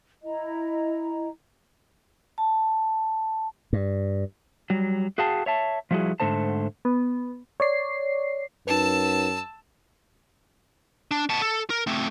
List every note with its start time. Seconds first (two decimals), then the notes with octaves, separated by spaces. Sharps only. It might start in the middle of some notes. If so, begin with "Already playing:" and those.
0.22 E4 D#5 A#5
2.38 A5
3.73 G2
4.70 F#3 G3
5.18 F#4 G#4 F5 G5 A5
5.46 C#5 E5 A5
5.91 F3 G3 E4 F#4 G#4
6.20 G#2 D3 A3 C5 A5
6.85 B3
7.60 C#5 D5 C7
8.67 F#2 D#4 B4 A5 E6
11.11 D4
11.29 B3 A5
11.42 A4
11.70 A#4
11.87 A3 C4